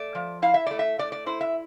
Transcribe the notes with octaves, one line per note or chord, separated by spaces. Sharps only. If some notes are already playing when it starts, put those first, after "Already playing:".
Already playing: A3 D5
F3
E4 F5
E5
A3 D5
E5
A3 D5
D5
E4 C5
E5